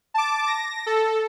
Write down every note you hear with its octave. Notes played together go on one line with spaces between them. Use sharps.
A5 D6
A#6
A4